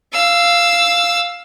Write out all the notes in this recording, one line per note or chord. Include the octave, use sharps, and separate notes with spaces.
F5 E6